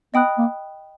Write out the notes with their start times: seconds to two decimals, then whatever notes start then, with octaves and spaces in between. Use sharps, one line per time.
0.14 B3 D#5 G5 B5 D#6 F#6
0.38 A#3